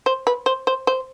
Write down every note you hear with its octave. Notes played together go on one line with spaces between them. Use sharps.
C5
B4
C5
C5
C5